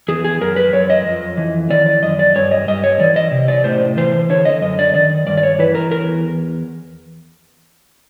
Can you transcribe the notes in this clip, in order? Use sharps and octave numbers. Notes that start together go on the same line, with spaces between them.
E2 G#4
G#4
F#2 A#4
B4
F#2 C#5
D#5
F2
E3
D#3 D5
D5
F#2 D#5
D5
G2 C#5
D#5
G2 D#5
C#5
E3 D5
D#5
C3
D5
A2 C5
E3 C5
D3 C#5
D#5
F#2 D#5
D5
D#3 D5
G2 D5
D5
C#5
E3 B4
A#4
E2 A#4